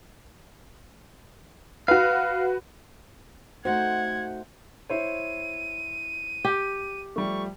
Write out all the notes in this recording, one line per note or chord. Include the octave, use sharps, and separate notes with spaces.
F#4 B4 F5
A3 D#4 F#4 C5 F#5 G#6
E4 C5 C#5 D#7
G4
F3 G3 A3 C#6